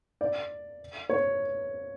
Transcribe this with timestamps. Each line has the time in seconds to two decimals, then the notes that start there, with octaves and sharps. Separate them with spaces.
0.21 D5
1.09 C#5